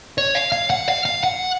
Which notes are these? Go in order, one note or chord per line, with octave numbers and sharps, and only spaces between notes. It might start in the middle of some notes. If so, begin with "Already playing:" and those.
C#5
F5
F5
F#5
F5
F5
F#5